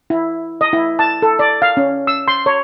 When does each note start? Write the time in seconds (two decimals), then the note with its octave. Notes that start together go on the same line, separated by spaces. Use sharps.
0.10 E4
0.61 D#5
0.73 E4
0.99 A5
1.22 A4
1.39 D5
1.62 F5
1.77 C#4
2.07 E6
2.28 C6
2.46 C#5